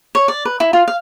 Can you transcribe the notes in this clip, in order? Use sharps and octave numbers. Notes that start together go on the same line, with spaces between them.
C#5
D5
B4
E4
F4
F5